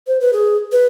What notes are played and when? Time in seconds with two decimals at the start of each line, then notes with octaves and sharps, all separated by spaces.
0.07 C5
0.21 B4
0.33 G#4
0.72 B4